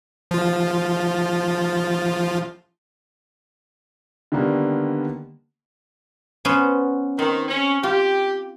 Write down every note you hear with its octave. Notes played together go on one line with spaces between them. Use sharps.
F3 F4
D3 D#3 G3 A#3 B3
B3 C#4 C5
D#3 C4
C#4
F4 G4